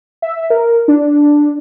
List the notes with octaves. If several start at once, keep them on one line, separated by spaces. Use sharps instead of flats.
E5
A#4
D4